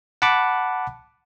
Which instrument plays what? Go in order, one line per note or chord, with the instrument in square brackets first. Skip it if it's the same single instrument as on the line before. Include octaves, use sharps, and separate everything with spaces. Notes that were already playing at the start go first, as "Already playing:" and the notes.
[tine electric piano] F#5 A5 B5 D6